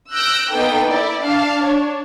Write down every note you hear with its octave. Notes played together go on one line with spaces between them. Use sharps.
E6 F#6 G6 A#6 D7
A#3 B3 D#4 A4 G5
E4 D5
D4 F5 A5
D4 C#5